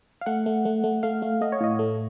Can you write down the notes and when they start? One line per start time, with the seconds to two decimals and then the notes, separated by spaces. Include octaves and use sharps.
0.21 F5
0.26 A3 F#5
0.46 A3
0.65 A3
0.84 A3
1.03 A3 F5
1.22 A3
1.41 A3 D#5
1.52 C#5
1.61 A2 D#5
1.79 A3